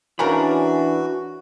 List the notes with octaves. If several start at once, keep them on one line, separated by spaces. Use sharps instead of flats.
C#3 E3 C#4 D4 F#4 A#4 B5